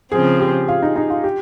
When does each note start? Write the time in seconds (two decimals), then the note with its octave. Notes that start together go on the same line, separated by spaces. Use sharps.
0.12 C#3 F3 C4 G#4
0.40 G4
0.68 F4
0.82 D#4
0.96 D#4
1.10 F4
1.24 G4